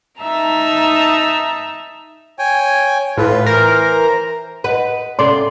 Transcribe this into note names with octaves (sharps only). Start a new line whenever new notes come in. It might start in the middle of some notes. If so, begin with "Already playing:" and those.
D#4 E5 A5 A#5
C#5 G5 G#5
A2 F4 B4
E3 A#4 C5
B4 D#5 F#5
C3 C#4 A4 D5 C6